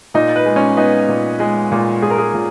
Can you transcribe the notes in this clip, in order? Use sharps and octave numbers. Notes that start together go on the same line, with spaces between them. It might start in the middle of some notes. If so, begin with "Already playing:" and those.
A#2 D#4
B4
G#3
C#4
B3 D#4
A#2
G#3
A#2
A#2 G#4
A#4
G#4
A#2